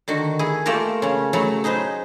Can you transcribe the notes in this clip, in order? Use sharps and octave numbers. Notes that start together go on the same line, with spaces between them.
D3 D#3 F#4
E4 G#4
A3 A#3 F4 G4 A#4
C#3 C#4
F#3 A3 E4 A4
D#4 G#4 B4 C5